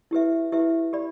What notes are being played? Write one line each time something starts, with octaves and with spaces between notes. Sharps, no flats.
E4 G4 B4 E5
E4 G4 B4 E5
G4 D5 B5